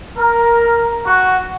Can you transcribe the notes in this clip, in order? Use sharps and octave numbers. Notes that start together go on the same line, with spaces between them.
A#4
F#4